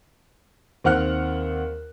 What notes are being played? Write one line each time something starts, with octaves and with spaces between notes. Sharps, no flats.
D#2 C4 F#5 F6 F#6